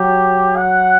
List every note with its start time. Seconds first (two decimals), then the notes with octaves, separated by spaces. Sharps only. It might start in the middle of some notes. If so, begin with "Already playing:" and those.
Already playing: F#3 G4
0.56 F#5